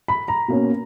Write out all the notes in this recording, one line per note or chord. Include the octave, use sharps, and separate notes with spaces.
B5
A#5
B2 A#3 C#4